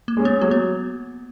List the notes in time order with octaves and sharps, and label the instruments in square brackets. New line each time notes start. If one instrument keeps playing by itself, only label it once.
[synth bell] A#3
[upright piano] G#3 C#4
[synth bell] B3
[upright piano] F#3 [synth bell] A#3
[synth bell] B3